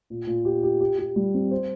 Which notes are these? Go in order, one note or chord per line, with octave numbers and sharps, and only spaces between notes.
A#2
A#2
G4
G4
G4
G4
G3
C4
C5